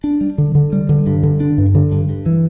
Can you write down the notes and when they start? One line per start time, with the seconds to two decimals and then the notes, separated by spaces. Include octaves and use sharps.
0.04 D4
0.21 G3
0.38 D3
0.55 D3
0.73 G3
0.89 D3
1.07 G2
1.23 D3
1.40 D4
1.58 G2
1.75 D3
1.92 G2
2.09 G2
2.26 E3